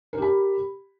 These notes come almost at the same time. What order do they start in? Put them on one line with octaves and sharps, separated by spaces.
A#4 G4 B5